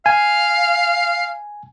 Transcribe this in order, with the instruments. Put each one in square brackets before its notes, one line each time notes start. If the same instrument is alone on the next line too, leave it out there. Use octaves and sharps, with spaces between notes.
[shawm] F5 [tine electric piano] G#5